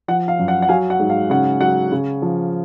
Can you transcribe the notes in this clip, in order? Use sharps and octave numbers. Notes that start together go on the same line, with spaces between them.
F3 F#5
F5
F#2
F#5
F#5
F#3 F5 G#5
F#5
G#2
F5
C#3 F#5
F#3 F#5
C#3
F3